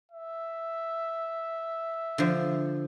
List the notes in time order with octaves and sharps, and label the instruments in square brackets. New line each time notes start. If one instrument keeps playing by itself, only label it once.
[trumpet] E5
[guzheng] D3 F3